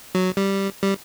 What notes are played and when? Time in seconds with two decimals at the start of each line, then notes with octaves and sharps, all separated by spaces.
0.15 F#3
0.37 G3
0.83 G3